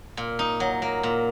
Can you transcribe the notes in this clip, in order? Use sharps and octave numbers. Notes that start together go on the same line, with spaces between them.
A#2
D#4
F#3
A#3
A#2